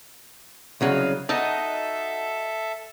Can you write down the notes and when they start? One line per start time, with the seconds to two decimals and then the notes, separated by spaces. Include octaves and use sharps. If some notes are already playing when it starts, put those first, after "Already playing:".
0.81 C2 C#3 F#3 D#5 F5
1.29 D#4 F#4 A4 D#5 E5 A5